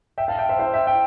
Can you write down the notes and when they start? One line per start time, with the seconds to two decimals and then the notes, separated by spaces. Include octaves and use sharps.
0.18 E5 G5
0.28 F5 A5
0.38 E5 G5
0.49 C5 E5
0.59 C5 E5
0.74 E5 G5
0.87 E5 G5